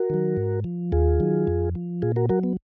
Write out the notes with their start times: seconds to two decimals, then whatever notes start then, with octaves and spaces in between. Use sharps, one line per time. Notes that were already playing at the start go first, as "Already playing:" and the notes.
Already playing: F#4 A#4
0.10 D#3 F#3
0.37 G#2
0.64 F3
0.92 D#2 F4 G#4
1.20 D#3 F#3
1.47 F2
1.75 F3
2.02 A#2 F4 G#4
2.16 F#4 A#4
2.29 F#3 F#4 A#4
2.43 B3